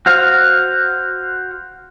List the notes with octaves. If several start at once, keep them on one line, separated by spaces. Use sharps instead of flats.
F#4 C5 F5